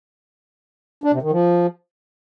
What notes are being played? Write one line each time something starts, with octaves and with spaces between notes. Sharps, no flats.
D4
C3
D#3
F3